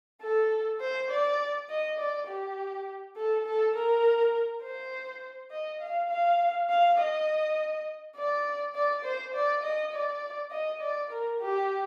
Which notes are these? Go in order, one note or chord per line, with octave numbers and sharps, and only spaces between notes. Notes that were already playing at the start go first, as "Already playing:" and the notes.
A4
C5
D5
D#5
D5
G4
A4
A4
A#4
C5
D#5
F5
F5
F5
D#5
D5
D5
C5
D5
D#5
D5
D#5
D5
A#4
G4